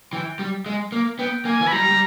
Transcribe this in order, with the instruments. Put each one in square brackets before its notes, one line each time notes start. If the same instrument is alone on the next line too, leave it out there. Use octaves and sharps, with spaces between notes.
[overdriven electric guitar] E3 [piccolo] G5
[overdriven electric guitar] G3
G#3
A#3
[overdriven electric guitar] B3 [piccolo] G5
[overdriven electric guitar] A#3 [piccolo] G#5
[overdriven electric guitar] E3
[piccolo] B5
[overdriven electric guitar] G3 [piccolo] A#5
[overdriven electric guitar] G3